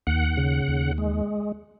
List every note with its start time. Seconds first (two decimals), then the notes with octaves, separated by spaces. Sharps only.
0.07 D#2 F#5
0.37 C#3
0.68 D#2
0.98 G#3